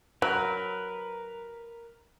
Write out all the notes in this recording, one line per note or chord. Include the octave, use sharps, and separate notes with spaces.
F#3 A#4 B4